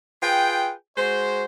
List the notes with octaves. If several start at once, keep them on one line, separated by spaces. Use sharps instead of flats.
F4 G#4 B4 G5
G#3 F#4 C5